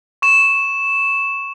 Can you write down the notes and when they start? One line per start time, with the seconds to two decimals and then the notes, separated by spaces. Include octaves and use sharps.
0.22 C#6 E7